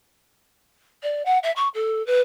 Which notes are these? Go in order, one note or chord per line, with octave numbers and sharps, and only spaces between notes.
D5
F#5
E5
C#6
A4
B4